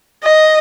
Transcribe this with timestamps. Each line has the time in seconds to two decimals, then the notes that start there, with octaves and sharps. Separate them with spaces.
0.24 D#5